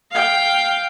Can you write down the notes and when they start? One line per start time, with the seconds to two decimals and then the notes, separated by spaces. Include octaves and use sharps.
0.11 F5 G5